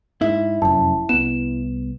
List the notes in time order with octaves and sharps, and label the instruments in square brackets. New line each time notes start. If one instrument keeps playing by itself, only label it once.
[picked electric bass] G#2 [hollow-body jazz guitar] E4
[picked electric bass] F1 F#2 [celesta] A5
[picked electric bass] C2 B3 [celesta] E7